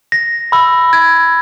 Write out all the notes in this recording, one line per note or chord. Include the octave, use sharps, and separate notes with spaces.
A#6
B5 E6
G#6